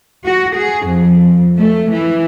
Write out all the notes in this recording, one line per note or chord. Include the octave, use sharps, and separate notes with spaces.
F#4
G#4
F2
A3
E3